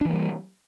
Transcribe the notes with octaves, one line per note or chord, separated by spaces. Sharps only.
E3 G3 A#3 D4